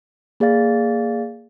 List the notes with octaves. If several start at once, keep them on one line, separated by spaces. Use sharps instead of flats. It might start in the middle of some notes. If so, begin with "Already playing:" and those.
A#3 G#4 D5 F5 A6